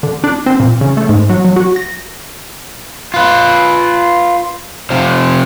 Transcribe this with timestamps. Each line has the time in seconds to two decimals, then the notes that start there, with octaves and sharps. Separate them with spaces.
0.03 D3
0.24 D4
0.46 C4
0.60 A#2
0.81 C#3
0.97 A3
1.09 G#2
1.30 F#3
1.45 F#3
1.56 F#4
1.76 A#6
3.14 F4 B4
4.90 C3 F3